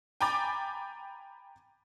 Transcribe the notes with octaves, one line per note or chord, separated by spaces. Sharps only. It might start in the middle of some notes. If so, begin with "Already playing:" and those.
G5 G#5 A#5 B5 D6 A6